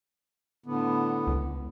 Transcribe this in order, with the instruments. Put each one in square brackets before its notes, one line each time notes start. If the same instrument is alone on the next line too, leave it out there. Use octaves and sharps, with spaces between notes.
[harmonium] A2 D3 B3
[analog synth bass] C#2